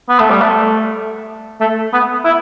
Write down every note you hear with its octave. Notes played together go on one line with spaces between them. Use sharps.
B3
A3
G3
A3
A3
B3
E4